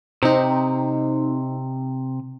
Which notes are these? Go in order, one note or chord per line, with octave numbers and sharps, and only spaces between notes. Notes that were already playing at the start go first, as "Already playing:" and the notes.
C3 C4 D#4